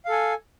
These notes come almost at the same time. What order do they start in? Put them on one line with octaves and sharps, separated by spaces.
F5 A4 G#5